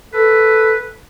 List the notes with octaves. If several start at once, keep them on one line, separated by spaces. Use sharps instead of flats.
A4 B4